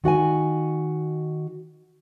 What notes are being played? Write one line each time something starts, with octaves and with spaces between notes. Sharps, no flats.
D#3 F#4 F#5 G#5